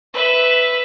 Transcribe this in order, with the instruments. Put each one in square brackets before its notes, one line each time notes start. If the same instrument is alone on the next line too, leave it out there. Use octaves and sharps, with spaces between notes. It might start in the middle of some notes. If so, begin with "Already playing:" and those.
[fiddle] B4 E5